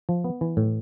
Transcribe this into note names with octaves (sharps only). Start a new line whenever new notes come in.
F3
B3
E3
A2